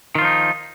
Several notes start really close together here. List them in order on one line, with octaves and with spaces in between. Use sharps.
D#3 F4 F3 D#4